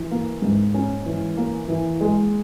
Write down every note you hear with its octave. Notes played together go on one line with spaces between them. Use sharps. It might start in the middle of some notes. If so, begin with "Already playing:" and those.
Already playing: E3
A#3
G#2
C#4
E3
A#3
E3
G#3